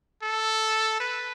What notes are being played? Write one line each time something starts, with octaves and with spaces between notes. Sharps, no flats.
A4
B4